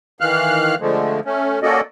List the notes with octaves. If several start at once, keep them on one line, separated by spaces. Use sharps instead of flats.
D#3 E3 F5 F6 F#6
D3 F3 G#3 A3
A3 C#4
A#3 C#4 F#4 A4 D5 D#5